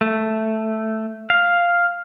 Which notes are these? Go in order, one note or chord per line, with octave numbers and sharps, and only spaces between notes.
A3
F5